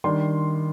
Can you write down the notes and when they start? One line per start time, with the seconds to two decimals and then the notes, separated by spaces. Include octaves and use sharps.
0.04 D#3 G3 D4 C6